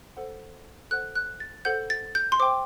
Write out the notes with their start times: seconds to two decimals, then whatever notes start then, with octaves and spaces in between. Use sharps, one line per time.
0.17 A4 C5 F#5
0.91 A4 C5 F#5 F#6
1.15 F#6
1.40 A6
1.65 A4 C5 F#5 G6
1.90 A6
2.15 G6
2.32 C6
2.39 C5 G5 D6